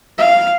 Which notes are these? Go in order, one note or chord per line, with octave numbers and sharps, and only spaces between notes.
F5